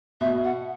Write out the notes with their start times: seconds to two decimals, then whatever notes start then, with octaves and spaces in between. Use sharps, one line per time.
0.21 B2 E5
0.44 F#5